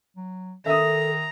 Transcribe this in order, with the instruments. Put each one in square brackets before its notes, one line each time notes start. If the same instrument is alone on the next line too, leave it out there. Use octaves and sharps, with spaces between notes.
[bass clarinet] F#3
[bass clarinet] D#3 [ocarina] A4 [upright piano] E5 D#6 [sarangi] A#5